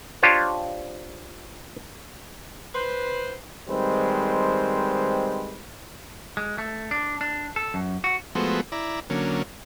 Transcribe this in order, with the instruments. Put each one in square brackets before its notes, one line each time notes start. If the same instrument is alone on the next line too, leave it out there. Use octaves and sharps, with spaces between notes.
[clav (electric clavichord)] D4 F4 G4 C5 C#5
[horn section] B4 C5
[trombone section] D#3 G3 G#3 C4 B4 C5
[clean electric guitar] G#3
A3
D4
D4
A4
F#2
F#4
[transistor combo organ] F3 G#3 A3 B3 F#4 C5
E4 D5 A#5
D3 F#3 A#3 C#4